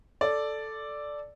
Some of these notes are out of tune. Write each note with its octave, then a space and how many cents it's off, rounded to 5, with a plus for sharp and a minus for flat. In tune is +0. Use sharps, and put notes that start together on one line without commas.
A4 +0 D5 +0